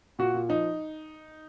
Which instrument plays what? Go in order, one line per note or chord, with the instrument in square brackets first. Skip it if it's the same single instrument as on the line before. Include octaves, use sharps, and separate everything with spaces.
[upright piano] A#2 F#4
A#2
F3 D#4